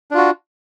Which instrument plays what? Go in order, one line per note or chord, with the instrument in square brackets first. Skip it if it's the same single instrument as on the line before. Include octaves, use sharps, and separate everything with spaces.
[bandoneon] D4
F4
F#4